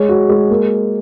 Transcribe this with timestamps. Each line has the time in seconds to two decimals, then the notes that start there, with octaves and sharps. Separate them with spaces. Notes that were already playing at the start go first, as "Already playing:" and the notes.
Already playing: G#3 C#5
0.09 F#4
0.29 G#3
0.50 A#3